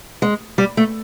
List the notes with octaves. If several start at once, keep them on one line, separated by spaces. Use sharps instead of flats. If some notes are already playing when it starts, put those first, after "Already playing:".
G#3
G3
A3